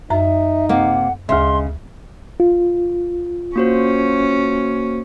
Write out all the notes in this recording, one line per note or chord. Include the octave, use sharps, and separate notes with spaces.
F#2 D#4 E5 A#5
C3 A#3 F#5
D2 C#3 G#3 E5 C6
F4
A#3 C#4 F#4 C5